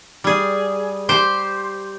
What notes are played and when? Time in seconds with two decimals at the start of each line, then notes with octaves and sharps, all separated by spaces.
0.24 G3 G#4
1.09 G4 C5